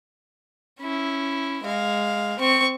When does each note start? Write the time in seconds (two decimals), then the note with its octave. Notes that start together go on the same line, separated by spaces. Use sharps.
0.81 C#4 E4
1.64 G#3 F5
2.39 C4 C#6